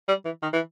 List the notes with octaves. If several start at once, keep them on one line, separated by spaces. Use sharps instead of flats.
G3
E3
D#3
E3